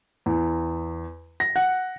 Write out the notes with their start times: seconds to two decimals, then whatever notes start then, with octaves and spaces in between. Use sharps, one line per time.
0.26 E2
1.40 A#6
1.56 F#5